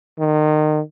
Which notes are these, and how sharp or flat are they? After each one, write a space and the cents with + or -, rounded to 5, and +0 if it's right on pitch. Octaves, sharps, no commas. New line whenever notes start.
D#3 -30